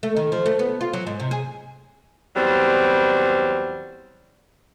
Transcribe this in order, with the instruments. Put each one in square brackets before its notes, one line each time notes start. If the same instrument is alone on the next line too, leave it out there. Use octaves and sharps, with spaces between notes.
[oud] A3
D#3
F3
A3
B3
F4
F#3
G#2
C3
G#4
[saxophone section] E2 F#3 G3 C4